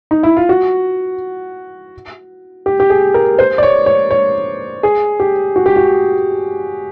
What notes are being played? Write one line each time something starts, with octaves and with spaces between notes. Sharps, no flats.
D#4
E4
F4
F#4
G4
G4
G#4
A#4
C5
D5
C#5
C#5
C#5
G#4
G4
F#4
G4
F#4